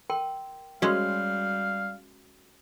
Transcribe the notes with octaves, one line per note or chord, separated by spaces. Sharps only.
A#4 G5 C6
G3 G#3 C#4 F#4 A#4 F5 C6